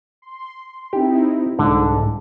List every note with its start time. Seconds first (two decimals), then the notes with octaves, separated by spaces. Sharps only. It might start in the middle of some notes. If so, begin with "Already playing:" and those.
0.22 C6
0.93 C4 D#4 E4 G4
1.59 C2 G#2 D3